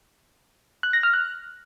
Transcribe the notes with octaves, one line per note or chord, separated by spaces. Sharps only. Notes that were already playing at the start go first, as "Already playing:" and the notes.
F#6
A#6
F6
F#6